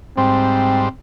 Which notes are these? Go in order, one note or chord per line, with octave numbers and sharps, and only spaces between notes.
G#2 G3 C4 C5